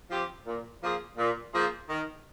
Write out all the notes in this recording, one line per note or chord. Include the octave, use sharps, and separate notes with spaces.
F3 C4 G4
A#2
F3 A#3 F4 G#4
A#2
F3 A#3 F4 G#4
D#3